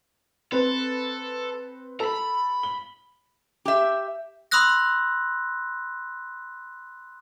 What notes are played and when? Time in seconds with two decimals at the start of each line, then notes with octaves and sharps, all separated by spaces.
0.52 C4 A4 B4
2.00 A4 A#5 B5
2.63 G7
3.65 G4 E5
4.51 B5 C6 D#6 E6 F#6 A#6